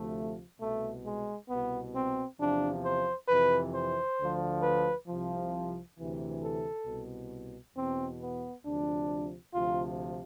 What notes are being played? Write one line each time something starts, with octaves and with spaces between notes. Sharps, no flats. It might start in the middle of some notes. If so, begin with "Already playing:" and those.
Already playing: D2 C3 F3 A3
C2 B2 A3
G#3
C2 B2 B3
C4
E2 C3 F3 D4
C5
F2 C3 E3 B4
C5
D2 D3 F3
B4
C2 C3 F3
D2 C3 E3
A4
C2 B2
E2 B2 C4
B3
D2 C3 F3 D4
D2 C3 F3 F4